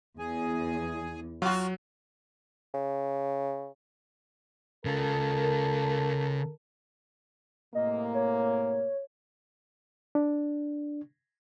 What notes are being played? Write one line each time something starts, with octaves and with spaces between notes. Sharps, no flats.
E2 G#4 G#5
F#3 F4 F#4
C#3
C#3 F4 A4 A#4
A2 C3 A#3 D#5
C#5
D4